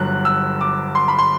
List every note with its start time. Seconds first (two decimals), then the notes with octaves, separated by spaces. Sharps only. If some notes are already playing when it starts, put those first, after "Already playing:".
Already playing: G1 G2 F#3 F#6
0.25 E6
0.61 D6
0.95 C6
1.08 B5
1.19 C6